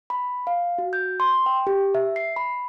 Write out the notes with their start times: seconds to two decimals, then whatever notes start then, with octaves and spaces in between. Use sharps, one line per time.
0.10 B5
0.47 F5
0.78 F#4
0.93 G6
1.20 C6
1.46 G5
1.67 G4
1.95 E5
2.16 C7
2.36 B5